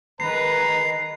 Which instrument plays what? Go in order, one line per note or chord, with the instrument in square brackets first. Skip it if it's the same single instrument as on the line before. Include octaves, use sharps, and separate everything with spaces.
[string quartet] D#3 G#3 [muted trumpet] B4 [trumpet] A#5 [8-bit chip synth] C7